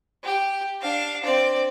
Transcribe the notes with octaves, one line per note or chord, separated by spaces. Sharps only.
G4
D4 F5
C4 D5